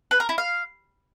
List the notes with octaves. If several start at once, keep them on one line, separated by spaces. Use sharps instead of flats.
B4
A#4
E4
F5